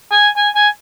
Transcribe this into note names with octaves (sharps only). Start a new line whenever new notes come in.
G#5
G#5
G#5